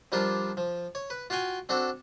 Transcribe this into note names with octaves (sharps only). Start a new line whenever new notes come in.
F3 G3 D4 F4 A#4
F3
C#5
B4
F4 F#4 F5 G5 G#5
C4 D4 F#4 A4